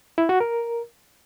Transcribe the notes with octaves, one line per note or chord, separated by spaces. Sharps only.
E4
F#4
A#4